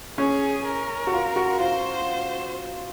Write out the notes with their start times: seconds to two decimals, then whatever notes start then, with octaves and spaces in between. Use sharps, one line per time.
0.18 C#4 G#4
0.65 A#4
1.07 F#4
1.13 F4
1.36 F#4
1.60 F4 C5